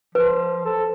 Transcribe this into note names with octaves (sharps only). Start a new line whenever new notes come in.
F3 B4
A4